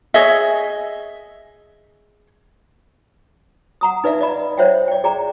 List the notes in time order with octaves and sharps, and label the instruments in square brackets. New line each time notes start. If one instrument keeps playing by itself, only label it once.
[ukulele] G#4 C#5 D#5 E5
[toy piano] F#5 A#5 D#6
D#4 B4 D5 E5 F5
D5 D#5 B5
C5 C#5 E5 F#5 G5
D5 G5
G#4 D5 G5 A#5